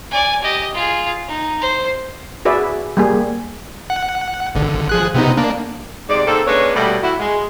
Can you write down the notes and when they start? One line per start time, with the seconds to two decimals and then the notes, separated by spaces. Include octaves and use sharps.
0.11 D5 G#5
0.42 G4 D#5
0.74 F4 G#4
1.27 D#4
1.61 C5
2.45 F#4 G#4 B4 D5 E5
2.97 G3 A#3 G#4
3.90 F#5
4.55 G#1 D3
4.89 F3 G#4 F#6
5.15 C3 B3 D#4
5.37 A#3 D4
6.10 G#2 C3 G#3 D5
6.28 G#2 A#3 C4 A4
6.47 G#3 A#3 C#4 D4 B4 C#5
6.75 B2 G3 A3
7.03 E4 F#4
7.19 G#3